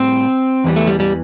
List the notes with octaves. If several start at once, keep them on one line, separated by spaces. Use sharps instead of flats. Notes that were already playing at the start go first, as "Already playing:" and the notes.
Already playing: A2 G3 C4
E2 E3 G3
A3
G3
G3